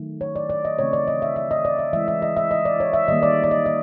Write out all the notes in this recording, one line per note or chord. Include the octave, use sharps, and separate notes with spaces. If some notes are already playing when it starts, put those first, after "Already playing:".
Already playing: D#3 F#3 A3
C#5
D5
D5
D#5
C#3 E3 A3 C4 C#5
D5
D#5
E5
E5
D#5
D5
E5
E3 G#3 C4 E5
E5
D#5
E5
D#5
D5
C#5
E5
D#3 G3 A#3 D#5
D5
D5
D#5
D#5